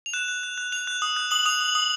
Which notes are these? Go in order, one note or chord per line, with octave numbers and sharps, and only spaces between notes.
F7
F#6 E7
F#6
F#6
F#6
F#6 F7
F#6
D#6
F#6
D#6 F#7
D#6 F7
D#6
D#6